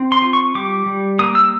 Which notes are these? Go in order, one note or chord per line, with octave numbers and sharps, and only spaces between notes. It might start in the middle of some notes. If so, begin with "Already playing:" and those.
Already playing: C4
C6
F4
C#6
G3 D6
G3
A#3 D#6
E6